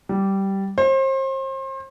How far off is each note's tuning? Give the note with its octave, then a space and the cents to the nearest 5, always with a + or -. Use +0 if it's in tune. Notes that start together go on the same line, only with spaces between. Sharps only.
G3 -10
C5 +35